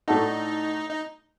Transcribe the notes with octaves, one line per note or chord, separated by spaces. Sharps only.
A2 A3 D4 D#4 F#4 A4
D#4